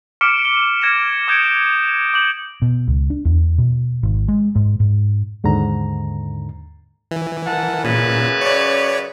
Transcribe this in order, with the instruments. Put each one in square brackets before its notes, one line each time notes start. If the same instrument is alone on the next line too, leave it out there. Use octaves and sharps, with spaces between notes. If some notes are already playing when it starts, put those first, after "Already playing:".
[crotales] D6 F6 B6 C#7 D7 E7
G7
F6 G#6 A#6 D7 E7
D6 D#6 G6 G#6 C#7 D7
D6 G6 F#7
[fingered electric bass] B2
C#2
D4
E2
B2
G#1
G#3
G#2
G#2
[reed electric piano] D#2 G#2 D3 A#5
[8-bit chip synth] E3
[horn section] A#4 F#5 A5
[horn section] F#2 C#3 B4 [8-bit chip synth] A#2
[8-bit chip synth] C#5 D5